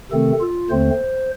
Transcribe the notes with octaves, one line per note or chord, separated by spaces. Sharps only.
C3 D#3 A3 C4 A4
F4
D#2 D3 A3 C4 C5